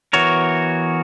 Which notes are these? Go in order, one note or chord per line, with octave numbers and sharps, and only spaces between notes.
E3 B3 F#4 A#4 C#5